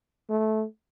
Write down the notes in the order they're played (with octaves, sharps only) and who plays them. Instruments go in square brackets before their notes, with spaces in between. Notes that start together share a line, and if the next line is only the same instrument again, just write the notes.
[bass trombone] A3